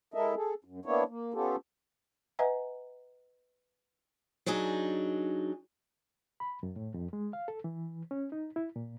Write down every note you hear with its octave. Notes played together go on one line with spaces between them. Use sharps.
G#3 E4 A4 A#4 D#5 E5
G#4 A4
F#2
A#3 B3 D4 E4 C#5
A#3
B3 C#4 F4 G4 A4
B4 D#5 E5 F#5 G#5 A#5
F#3 D4 D#4 G#4
B5
F#2
A2
F2
G#3
F5
A4
E3
C#4
D#4
E4
A#2